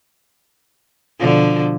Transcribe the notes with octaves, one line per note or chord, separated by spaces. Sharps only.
B2 D3 F3